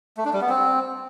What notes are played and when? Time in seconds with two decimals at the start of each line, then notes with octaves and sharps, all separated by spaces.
0.17 A3
0.25 D4
0.33 G3
0.41 B3
0.49 C4